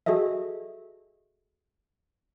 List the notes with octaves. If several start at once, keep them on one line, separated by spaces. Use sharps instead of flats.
F#4 G#4 A4 D#5 E5